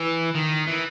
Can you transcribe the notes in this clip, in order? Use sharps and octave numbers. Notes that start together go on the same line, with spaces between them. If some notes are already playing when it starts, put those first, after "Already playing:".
Already playing: E3
D#3
E3